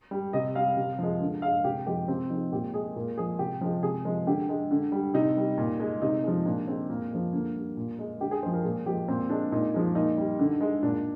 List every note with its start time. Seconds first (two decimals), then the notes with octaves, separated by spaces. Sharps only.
0.11 G3
0.33 C3 D#5
0.55 G3 F5
0.77 C3
0.99 F3 G#3
1.21 D3
1.42 G#3 F5
1.64 C3 G4
1.87 F3 G#3 G4
2.08 C3 C4
2.30 F3 G#3 D#4
2.52 A#2 G4
2.74 G#3 G#4
2.96 A#2 A#4
3.17 F3 G#3 G#4
3.39 C3 G4
3.61 F3 G#3
3.83 C3 G#4
4.05 F3 G#3
4.27 D3 G4
4.49 G#3
4.71 D3
4.92 G3
5.14 C3 D#4
5.37 G3
5.58 A#2
5.80 G#3
6.02 C3 D#4
6.23 F3 G#3
6.45 A#2 D4
6.68 G#3 C4
6.89 A#2 A#3
7.11 F3 G#3
7.33 D3 A#3
7.55 G3
7.77 A#2
7.99 G#3
8.20 D3 G4
8.31 G#4
8.43 F3 G#3 C5
8.54 A#4
8.64 A#2 G#4
8.86 F3 G#3 G4
9.08 A#2 C4
9.30 G#3 D4
9.52 A#2 D#4
9.74 F3 G#3
9.95 A#2 D#4
10.18 G3
10.39 D3
10.61 G#3
10.82 A#2 D4